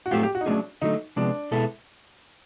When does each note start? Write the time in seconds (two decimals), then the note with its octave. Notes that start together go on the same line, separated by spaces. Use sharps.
0.06 F#4
0.11 A2 F#3 A3 C4 F4 G4
0.23 G4
0.35 F#4
0.41 D#4
0.46 F#3 A3 C#4 D4 F4 G#4
0.82 D3 F#3 A3 D#4
1.16 C3 F3 G#3 B3 D4
1.51 B2 G#3 B3 E4 A4